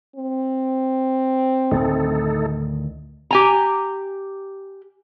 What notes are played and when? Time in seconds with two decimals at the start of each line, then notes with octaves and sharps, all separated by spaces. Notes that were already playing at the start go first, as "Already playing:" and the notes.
0.16 C4
1.72 D2 A2 D#3 A3 D#4 A4
3.31 G4 G#5 A#5